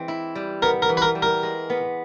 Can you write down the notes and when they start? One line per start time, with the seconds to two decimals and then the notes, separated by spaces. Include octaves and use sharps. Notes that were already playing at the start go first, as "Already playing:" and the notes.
Already playing: E3 G#3 C4
0.08 E4
0.35 G3
0.62 B3 A#4
0.82 A#4
0.89 E3
0.97 B4
1.02 A#4
1.15 G3
1.22 A#4
1.43 G#3
1.70 B3